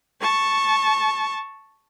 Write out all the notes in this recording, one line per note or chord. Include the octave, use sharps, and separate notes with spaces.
A5 C#6